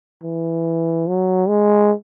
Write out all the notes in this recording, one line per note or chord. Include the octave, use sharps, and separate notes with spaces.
E3
F#3
G#3